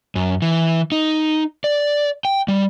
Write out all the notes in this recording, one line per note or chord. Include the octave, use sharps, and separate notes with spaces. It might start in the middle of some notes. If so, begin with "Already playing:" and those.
F#2
E3
D#4
D5
G5
G3